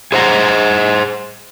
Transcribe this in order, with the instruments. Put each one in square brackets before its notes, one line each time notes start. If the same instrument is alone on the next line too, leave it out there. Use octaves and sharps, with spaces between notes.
[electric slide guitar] G#4 C5 F#5 A#5